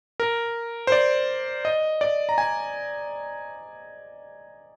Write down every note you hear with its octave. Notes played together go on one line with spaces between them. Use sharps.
A#4
C5
D5
D#5
D5
A#5
G#5